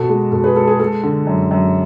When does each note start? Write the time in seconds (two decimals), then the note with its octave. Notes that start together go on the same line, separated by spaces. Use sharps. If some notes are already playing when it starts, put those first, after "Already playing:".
Already playing: B2 A4
0.09 G#3
0.32 B2 A4
0.44 G#4 B4
0.56 G#3 A4
0.67 G#4
0.80 G#3 A4
1.03 D3
1.27 F#2
1.51 F#2